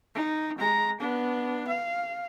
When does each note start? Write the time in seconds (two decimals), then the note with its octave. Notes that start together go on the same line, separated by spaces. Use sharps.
0.15 D#4
0.58 G#3 A#5
1.00 B3 D4
1.67 F5